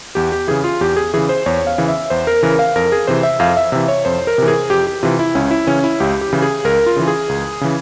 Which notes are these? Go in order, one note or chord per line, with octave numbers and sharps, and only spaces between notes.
E2 G4
G4
C#3 E3 G#4
F4
E2 G4
G#4
C#3 E3 G#4
C5
E2 C#5
F5
C#3 E3
E5
E2 C5
A#4
C#3 E3 A#4
F5
F2 A#4
G#4
C3 E3 C5
E5
F2 F5
E5
C3 E3 E5
C#5
F2 C5
A#4
C3 E3
G#4
F2 G4
G4
C3 E3 F4
E4
C#2 C#4
E4
C#3 E3 C#4
E4
C#2 G4
G4
C#3 E3
G#4
C#2 A#4
F4
C#3 E3
G#4
C#2
C#3 E3